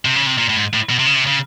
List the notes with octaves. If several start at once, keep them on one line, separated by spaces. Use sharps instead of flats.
C3
C#3
C3
A#2
A2
G#2
A2
B2
C3
C#3
C3
C#3